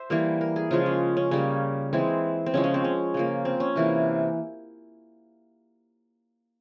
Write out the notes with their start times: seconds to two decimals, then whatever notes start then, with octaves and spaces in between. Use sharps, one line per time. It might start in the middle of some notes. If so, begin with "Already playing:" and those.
Already playing: C5 E5
0.10 E3 G3 A#3
0.41 A#4
0.56 G#4
0.71 C#3 F3 G#3 F4
0.86 C#4
1.17 C#4
1.31 C#3 G3 A#3 C#4
1.93 E3 G#3 C4
2.46 C4
2.54 C#3 F3 G#3 C#4
2.64 C#4
2.74 C4
2.84 C#4
3.14 C#3 F3 A#3
3.45 C4
3.60 C#4
3.76 C3 E3 A#3